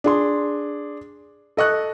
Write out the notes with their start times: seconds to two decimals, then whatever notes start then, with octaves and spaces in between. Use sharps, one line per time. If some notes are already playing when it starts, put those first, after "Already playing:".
0.04 D4 G#4 C6
1.57 A4 D#5 C#6 F#6